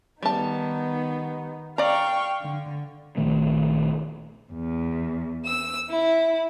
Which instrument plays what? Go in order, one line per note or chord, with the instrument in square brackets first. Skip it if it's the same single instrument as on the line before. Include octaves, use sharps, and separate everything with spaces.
[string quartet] D#3 B3 D#4 [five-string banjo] G3 A5
[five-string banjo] D5 A#5 [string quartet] F5 G5 C#6
[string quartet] D3
[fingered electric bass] A#1 D#3 A3
[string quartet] E2
E6
E4